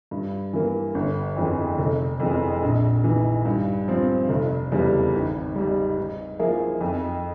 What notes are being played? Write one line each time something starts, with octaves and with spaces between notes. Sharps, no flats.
G2
E3 A#3
G1
F2 E3 G#3
F1
F2 E3 G#3
A#1
G#2 E3
G2
F3 C4
F1
E2 C#3 G3
G#1
G#2 G3
G#2
F3 A#3 E4 G#4
F2